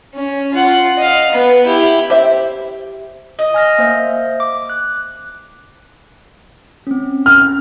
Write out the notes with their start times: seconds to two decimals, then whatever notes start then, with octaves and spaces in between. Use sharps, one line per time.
0.14 C#4
0.54 F4 F#5
0.98 D#5 F5
1.32 B3
1.66 E4 G4
2.10 G4 C5 E5
3.39 D#5
3.54 G#5 F6 A#6
3.78 A#3 C5 E5
4.40 D6
4.70 F#6
6.87 C4 C#4
7.26 F6